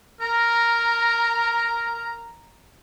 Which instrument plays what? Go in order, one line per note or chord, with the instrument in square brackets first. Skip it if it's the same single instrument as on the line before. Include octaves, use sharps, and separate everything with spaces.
[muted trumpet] A#4 [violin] A#5